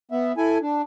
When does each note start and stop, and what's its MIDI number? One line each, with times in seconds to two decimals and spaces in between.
0.11 0.32 59
0.11 0.32 76
0.37 0.58 64
0.37 0.58 69
0.37 0.58 80
0.62 0.82 62